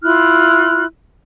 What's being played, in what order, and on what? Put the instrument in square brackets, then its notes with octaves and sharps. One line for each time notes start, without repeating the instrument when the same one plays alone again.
[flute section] E4 F4 F6 F#6